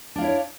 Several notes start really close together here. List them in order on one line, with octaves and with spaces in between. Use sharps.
D4 F5 E4 C#5